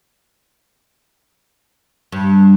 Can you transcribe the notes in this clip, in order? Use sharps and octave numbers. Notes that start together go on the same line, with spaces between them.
G2